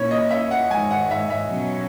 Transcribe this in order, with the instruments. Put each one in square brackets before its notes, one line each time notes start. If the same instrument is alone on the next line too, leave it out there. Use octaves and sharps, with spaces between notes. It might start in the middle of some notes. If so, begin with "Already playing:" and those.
Already playing: [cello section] A#2 A#3 C#4 E4 [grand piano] C#5
[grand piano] D#5
E5
F#5
[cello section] G#2 D#3 G#3 [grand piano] G#5
[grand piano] F#5
E5
E5
[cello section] B2 F#3 C#4